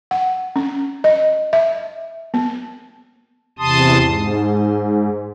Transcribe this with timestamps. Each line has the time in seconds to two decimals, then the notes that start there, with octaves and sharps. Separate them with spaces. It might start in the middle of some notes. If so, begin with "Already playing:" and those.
0.11 F#5
0.56 C#4
1.04 D#5
1.53 E5
2.34 B3
3.59 E2 C3 A5 C6 D#6
4.03 G#2